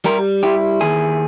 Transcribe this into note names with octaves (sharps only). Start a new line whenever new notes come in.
G3 G4 A#4
E4 G4
D#2 G#4